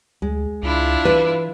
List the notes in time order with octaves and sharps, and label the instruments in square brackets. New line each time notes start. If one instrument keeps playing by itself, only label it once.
[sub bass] D2 [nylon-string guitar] G#3
[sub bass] C#2 [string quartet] D4 E4 F4
[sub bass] E3 [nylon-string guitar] B4